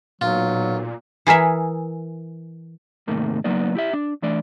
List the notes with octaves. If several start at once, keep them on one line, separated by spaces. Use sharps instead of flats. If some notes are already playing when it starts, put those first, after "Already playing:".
B1 A#2 F#3 F4
E3 G#4 A#4 E5
G#2 C3 D#3 A3 A#3
C#2 F#3 A#3 B3 D#4 D5
E4 G4 E5
D4
E3 A3 D4 D5